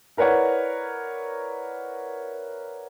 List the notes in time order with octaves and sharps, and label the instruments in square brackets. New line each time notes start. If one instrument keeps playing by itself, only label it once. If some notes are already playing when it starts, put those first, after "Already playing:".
[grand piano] E4 A#4 B4 C#5 D5 F#5